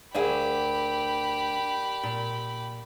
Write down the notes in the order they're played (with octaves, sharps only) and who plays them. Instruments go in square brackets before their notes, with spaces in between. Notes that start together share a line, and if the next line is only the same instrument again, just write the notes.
[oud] D2 G#4 F5 [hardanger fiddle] G4 B5 [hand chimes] A#4 D5
[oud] A#2